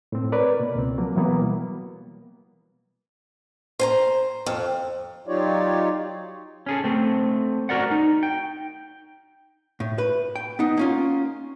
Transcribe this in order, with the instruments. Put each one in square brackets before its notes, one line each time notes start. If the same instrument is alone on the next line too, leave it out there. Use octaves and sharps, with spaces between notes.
[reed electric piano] A2 C4
A#4 B4 C#5 D5
B2 A#3
C#2 C4
F3 F#3 A#3
B2 E3 F#3 G3 A#3 B3
[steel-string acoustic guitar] C5 G#5 A#5
F2
[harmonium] F#3 D#4 F4 G4 C#5 D5
[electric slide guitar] C#4 G#4 A4
A3 C4
F#4 A#4 D5 F#5
D#4
G5
[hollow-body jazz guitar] A2
B4
G5
B3 D#4
A#3 C#4 F4